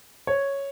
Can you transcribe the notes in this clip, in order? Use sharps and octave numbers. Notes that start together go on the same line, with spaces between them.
C#5